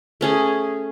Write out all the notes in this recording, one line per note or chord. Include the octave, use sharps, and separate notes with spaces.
A3 C#4 G#4